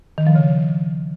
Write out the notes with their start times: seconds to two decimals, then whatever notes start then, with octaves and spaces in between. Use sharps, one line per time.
0.18 D#3
0.27 F3
0.35 C#3